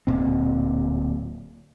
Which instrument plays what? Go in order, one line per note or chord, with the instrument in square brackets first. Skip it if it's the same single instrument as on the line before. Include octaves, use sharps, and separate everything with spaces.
[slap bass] D1 A#2 C4